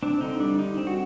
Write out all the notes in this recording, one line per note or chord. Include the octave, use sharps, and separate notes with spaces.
C4 D4
D3 D#4
G3 D4
D3 D#4
C4
F#4